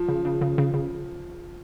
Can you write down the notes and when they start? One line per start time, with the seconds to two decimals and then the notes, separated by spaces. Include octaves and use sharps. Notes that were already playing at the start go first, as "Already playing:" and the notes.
Already playing: F3
0.08 C#3
0.25 C#3
0.41 C#3
0.58 C#3
0.74 C#3